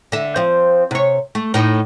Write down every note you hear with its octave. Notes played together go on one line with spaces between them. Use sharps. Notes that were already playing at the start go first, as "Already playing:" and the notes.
D3 E5
F3 C4
C3 C#5
A3
A2 D#4